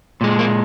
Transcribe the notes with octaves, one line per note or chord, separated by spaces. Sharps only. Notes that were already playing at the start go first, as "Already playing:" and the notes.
A#2 G#3
A#3